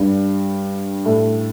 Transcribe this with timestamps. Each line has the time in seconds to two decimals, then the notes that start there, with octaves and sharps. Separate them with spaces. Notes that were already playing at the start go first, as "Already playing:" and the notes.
Already playing: G2 G3
1.05 A2 A3